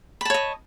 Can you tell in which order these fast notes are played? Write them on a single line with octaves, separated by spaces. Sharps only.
B5 A5 C#5 D#5